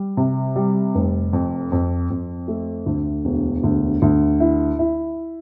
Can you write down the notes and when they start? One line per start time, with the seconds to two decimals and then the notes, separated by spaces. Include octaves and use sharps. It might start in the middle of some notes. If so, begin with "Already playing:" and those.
Already playing: G3
0.17 C3
0.56 G3
0.95 F1
1.33 F2
1.72 F2
2.10 F2
2.48 A3
2.86 D2
3.25 E1
3.63 D2
4.02 D2
4.40 E4
4.79 E4